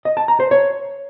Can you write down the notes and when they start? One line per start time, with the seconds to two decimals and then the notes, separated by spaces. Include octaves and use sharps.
0.05 D#5
0.17 A5
0.28 A#5
0.40 C5
0.51 C#5